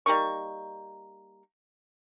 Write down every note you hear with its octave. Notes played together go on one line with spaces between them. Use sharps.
G3 A#3 D#4 C#6